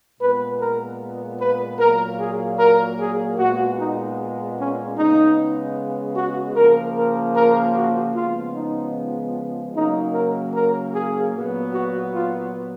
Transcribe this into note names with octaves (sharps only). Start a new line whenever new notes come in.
A#2 G#3 B3 B4
A#4
B4
A#2 F#3 A#3 A#4
G#4
A#4
G#4
A#2 G#3 B3 F#4
D#4
C#4
C#3 G#3 B3 D#4
F#4
C#3 F3 A#3 A#4
A#4
A#4
F#4
C#3 F3 G#3 B3 F4
D#4
C#3 F#3 A#3 D#4
A#4
A#4
G#4
A#2 F#3 B3
F#4
F4